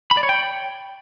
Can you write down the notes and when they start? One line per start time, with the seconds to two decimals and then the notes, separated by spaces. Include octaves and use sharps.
0.11 B5
0.17 D5
0.23 C#5
0.29 G5